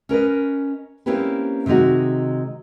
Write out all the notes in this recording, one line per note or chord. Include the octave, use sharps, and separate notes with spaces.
C#4 A#4 B4 D#5
A#3 C4 C#4 E4 G4 B4
C3 D#3 G#3 D#4 F#4